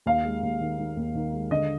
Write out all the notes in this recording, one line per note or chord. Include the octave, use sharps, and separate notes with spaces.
D#2 F5
G#3
D#2
D#3
D#3
D#2
D#3
G#3
D3 D#5